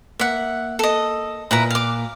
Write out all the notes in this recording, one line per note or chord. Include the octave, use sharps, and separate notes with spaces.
A#3 E5 F#5
A4 D#5
A#2 E4 B4 A#5
F5 D6